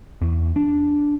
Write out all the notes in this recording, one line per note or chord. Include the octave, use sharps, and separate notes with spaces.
E2
D4